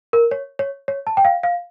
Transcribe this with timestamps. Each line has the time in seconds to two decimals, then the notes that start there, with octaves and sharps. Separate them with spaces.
0.13 A#4
0.31 C#5
0.59 C#5
0.88 C#5
1.07 A5
1.17 G5
1.25 F5
1.43 F5